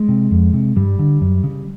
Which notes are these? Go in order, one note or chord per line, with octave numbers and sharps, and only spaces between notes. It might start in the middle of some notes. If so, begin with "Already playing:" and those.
Already playing: G#3
C3
F2
C3
G2 G3
D3
F#2
C#3